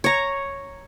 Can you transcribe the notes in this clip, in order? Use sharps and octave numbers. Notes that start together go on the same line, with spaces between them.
C#5 A#5